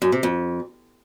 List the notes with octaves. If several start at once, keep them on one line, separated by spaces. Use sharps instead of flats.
F#2
C3
F2